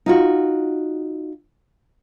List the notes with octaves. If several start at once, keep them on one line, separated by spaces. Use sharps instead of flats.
D#4 F4 F#4